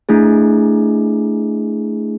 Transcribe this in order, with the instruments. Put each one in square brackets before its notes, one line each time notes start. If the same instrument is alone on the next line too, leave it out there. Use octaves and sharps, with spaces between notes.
[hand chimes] A3 D4 E4 G#4